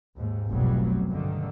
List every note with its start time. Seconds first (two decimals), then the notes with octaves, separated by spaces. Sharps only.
0.16 D#2 G#2
0.48 F1 B1 F2 B2 F#3 G3
1.07 G2 D3 D#3